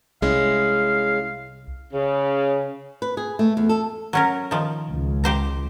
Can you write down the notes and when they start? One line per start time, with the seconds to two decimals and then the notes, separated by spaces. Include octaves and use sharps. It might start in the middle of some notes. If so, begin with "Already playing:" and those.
0.22 C2 G#3 C#4 E4 F5
1.94 C#3
3.02 B4
3.17 G#4
3.39 A3
3.57 E2
3.69 A4
4.13 F#3 C#4 A#4
4.51 D#3 F3
4.90 C#2
5.24 G4 C5 A#5